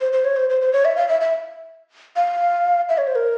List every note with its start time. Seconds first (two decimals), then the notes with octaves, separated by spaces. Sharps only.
0.01 C5
0.12 C5
0.25 C#5
0.36 C5
0.50 C5
0.61 C5
0.73 C#5
0.85 E5
0.96 F5
1.08 E5
1.21 E5
2.16 F5
2.89 E5
2.98 C#5
3.07 C5
3.15 A#4